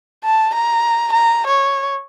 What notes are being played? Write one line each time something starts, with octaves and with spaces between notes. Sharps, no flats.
A5
A#5
A#5
C#5